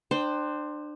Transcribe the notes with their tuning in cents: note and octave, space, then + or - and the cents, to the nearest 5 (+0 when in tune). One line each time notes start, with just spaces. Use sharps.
D4 +30 C5 +0 G5 +0